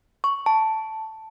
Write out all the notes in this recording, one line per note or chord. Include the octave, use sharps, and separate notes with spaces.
C#6
A5